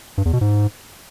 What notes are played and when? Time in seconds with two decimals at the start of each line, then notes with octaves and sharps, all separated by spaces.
0.18 G2
0.25 E2
0.33 B2
0.41 G#2